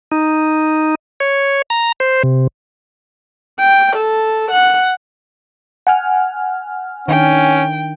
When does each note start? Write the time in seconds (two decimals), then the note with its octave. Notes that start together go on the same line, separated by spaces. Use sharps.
0.12 D#4
1.20 C#5
1.70 A#5
2.00 C5
2.23 C3
3.59 G5
3.96 A4
4.51 F#5
5.87 F#5 G#5 F6
7.08 D#3 C#4 D4 G5